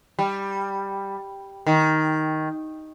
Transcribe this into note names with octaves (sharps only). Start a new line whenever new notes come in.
G3
D#3